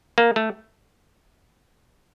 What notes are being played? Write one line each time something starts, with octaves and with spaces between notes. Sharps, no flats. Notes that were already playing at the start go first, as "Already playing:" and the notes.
A#3
A3